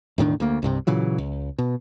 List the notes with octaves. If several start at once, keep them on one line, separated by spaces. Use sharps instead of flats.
E1 A2 D#3 D4
D2 A#3
C2 G2 C3
A#2 C#3 E3 F#3
C#2
B2